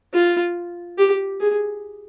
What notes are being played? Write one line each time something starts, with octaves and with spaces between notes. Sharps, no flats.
F4
G4
G#4